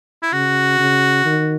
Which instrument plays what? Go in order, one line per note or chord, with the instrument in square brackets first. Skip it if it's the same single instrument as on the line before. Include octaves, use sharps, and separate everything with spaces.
[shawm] E4
[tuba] C#3 [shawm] F#4
[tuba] C#3
D#3